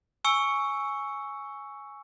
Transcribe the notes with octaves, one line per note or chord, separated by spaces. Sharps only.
G#5 C#6 E6 C#7